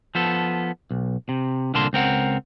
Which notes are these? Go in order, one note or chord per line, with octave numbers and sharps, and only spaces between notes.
F3 B3 A4
B1
C3
C2 A#2 D3 A#4 A5 C6
C#2 C4 A#4 F#5